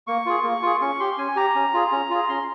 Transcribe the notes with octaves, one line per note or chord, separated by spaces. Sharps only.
A#3 C#6
F4 G#4
A#3
F4 G#4
C#4 C#6
G4 C6
C#4 G#5
G4 A#5
C#4
F4 G#4
C#4
F4 G#4
C#4 C6